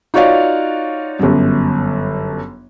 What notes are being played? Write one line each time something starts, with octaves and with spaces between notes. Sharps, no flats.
D#4 F4 F#4 C#5 D5 F5
G1 F#2